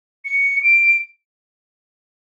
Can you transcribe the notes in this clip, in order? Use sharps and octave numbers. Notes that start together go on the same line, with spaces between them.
C#7
D7